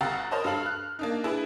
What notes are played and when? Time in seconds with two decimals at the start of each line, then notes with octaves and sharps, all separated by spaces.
0.01 G1 F5 F#5 A#5 E6 A6
0.31 A#4 C5 C#5 D#5 A5 B5
0.44 G2 A4 F5 F#7
0.63 F6 F#6
0.99 A#3 D4 D#4
1.23 D4 E4 G#4 B4